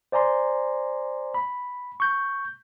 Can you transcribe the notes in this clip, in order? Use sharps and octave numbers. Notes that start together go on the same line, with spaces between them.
C5 D5 G#5 A#5 C6
B5
C#6 G6